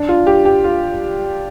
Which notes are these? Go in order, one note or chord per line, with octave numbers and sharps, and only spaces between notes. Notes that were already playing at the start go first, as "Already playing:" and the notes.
Already playing: D4
F4
G4
G4
F4